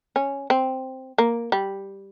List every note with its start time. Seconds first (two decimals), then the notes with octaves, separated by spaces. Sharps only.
0.16 C#4
0.50 C4
1.18 A#3
1.52 G3